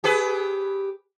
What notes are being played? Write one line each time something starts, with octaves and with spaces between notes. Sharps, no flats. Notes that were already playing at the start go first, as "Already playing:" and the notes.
G4 G#4 B4